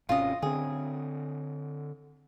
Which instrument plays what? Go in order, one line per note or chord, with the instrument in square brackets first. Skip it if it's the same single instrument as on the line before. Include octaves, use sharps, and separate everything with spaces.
[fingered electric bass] G#1 C3 C#4 [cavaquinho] F4 D#5
[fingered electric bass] D3 C4 [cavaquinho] G#4